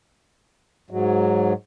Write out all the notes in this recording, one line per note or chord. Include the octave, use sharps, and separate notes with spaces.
G#2 F#3